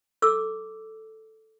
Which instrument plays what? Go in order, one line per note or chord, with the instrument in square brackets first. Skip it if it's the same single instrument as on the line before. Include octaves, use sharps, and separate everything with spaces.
[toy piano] A4 D6 E6